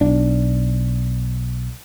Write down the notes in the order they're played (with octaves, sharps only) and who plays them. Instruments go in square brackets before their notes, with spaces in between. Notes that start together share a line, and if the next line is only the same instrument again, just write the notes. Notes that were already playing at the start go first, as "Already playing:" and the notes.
[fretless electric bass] B1 D4